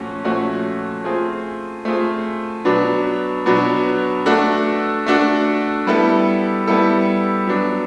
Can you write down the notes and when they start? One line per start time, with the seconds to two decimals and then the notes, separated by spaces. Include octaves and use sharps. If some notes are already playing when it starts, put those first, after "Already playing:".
Already playing: A#2 F3 A3 C#4 F#4
0.24 A#2 F3 A3 C#4 F#4
1.04 A3 C4 F4 G#4
1.85 A3 C4 F4 G#4
2.65 B2 F#3 B3 D4
3.46 B2 F#3 B3 D4
4.26 A3 D4 F#4 A4
5.06 A3 D4 F#4 A4
5.87 G3 B3 E4 A4
6.68 G3 B3 E4 A4
7.47 F#3 B3 D4